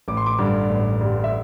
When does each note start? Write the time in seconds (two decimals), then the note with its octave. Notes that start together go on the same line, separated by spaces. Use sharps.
0.08 A1 D6
0.17 C6
0.26 D6
0.39 G2 D3 G3
0.69 A1
1.01 G2 D3 G3
1.24 E5